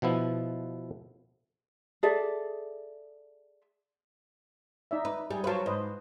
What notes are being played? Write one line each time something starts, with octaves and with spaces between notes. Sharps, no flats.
B2 F3 B3 E4
G#4 A4 D5 E5
D#4 D5 E5
B4
G3 G#4
F#3 B4 C5 F5 A5
G#2 B4 C5 D#5